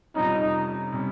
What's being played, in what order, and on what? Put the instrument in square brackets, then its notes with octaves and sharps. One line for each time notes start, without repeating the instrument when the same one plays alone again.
[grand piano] F2 C3 G3 C#4 [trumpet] D#4
[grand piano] C3 G3 C#4